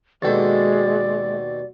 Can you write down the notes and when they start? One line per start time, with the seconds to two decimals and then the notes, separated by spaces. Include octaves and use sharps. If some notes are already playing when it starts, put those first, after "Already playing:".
0.22 D#2 B2 G#3 F#4 A4 D5 G5 A6